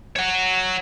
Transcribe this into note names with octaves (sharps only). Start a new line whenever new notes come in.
C#5 F#5